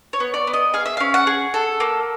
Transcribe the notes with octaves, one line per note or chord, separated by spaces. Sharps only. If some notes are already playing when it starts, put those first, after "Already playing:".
C#5
B3
D5
B3
D#5
G#4 F5
E5
C#4 F5
F#5
G#4
A4
A#3